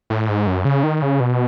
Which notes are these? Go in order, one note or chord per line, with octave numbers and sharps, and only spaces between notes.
A2
G#2
F#2
C#3
D#3
C#3
B2